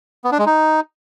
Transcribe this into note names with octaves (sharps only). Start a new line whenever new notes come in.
B3
D4
G#3
D#4